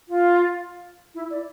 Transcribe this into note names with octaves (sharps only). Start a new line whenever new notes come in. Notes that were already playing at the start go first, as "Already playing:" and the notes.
F4
E4
D5